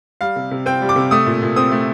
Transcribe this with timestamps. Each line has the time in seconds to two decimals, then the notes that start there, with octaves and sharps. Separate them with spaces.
0.21 G3 F5
0.36 C3
0.51 C3
0.66 C4 G5
0.82 G3
0.89 D6
0.96 C3
1.11 A3 D#6
1.26 A#2
1.42 A#2
1.56 C4 D#6
1.71 A3